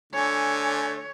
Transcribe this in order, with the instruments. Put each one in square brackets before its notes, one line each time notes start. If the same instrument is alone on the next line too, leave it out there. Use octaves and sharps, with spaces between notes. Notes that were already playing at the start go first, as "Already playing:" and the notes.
[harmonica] D3 A3 [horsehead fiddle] C#5 [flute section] G#5